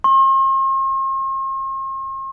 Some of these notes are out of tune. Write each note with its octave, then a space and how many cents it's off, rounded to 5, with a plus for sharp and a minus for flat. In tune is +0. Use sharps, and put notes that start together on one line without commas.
C6 +45